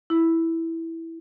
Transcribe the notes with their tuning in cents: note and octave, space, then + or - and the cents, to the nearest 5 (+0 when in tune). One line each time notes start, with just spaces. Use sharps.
E4 -5